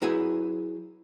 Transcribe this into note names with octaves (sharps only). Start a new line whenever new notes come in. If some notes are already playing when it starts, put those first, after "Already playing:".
F#3 E4 G#4 B4 G#5